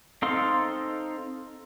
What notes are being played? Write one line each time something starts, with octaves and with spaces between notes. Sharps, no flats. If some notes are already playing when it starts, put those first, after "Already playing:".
C4 D#4 A4 F5 C6